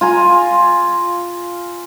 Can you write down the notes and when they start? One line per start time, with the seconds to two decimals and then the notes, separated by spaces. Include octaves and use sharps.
0.01 F4 G#5 A#5